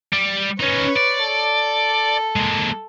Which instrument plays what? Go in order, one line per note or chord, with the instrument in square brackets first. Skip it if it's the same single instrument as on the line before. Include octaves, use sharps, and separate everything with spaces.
[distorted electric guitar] G3
[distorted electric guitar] C#4 D#4 [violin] B4 C#5
[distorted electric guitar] D5
[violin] A4
[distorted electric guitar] G#3 A#3